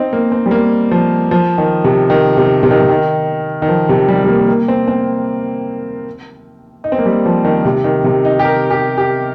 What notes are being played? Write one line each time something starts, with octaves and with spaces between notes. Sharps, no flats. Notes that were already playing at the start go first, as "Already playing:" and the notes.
Already playing: C4 D#4
A#3
C4
G3
A#3
F3
F3
D#3
C3
D#3
C3
C3
D#3
C3
D#3
D#3
F3
C3
G3
G3
A#3
A#3
C4
C4
D#4
C4
A#3
G3
F3
D#3
C3
D#3
C3
D#4
G4
A#4
G4
G4